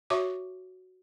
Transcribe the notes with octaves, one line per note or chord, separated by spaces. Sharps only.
F#4 C#5 E5 C#6 D6